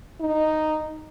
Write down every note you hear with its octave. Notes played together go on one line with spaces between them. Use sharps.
D#4